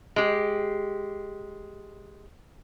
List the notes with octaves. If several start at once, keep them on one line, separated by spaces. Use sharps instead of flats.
G#3 G4